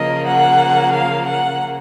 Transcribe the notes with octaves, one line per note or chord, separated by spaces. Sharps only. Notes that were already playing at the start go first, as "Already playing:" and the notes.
Already playing: C#3 F3 A#3 D#5
F#5
F5
F#5